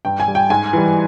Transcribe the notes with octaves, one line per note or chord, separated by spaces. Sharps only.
G2 G5
G#5
G3
G5
G#2 G#5
E3 G3